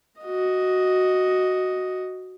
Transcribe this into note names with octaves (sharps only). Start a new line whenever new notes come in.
F#4 D#5